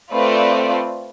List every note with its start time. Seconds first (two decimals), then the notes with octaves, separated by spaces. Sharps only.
0.12 A3 C4 F4 B4 D5